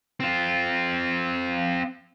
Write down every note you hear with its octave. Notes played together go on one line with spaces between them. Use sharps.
C4 F4